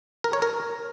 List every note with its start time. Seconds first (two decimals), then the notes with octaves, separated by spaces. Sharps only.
0.24 A#4
0.33 C#5
0.42 A#4